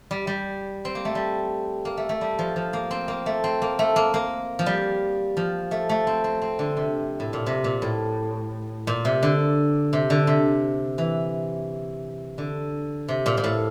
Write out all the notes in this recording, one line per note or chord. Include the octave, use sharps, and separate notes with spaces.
G3
G3
C4
A#3
A3
G3
A#3
A3
A3
G3
F3
F3
A#3
C4
A#3
A3
C4
A#3
A3
A#3
A#3
F3
G3
F3
A3
A3
C4
C4
C4
D3
C3
A2
A#2
C3
A#2
A2
A#2
C3
D3
C3
D3
C3
E3
D3
C3
A#2
A#2
A2